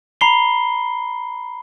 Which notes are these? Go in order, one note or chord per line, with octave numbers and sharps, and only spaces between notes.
A#5 B5 C7 G7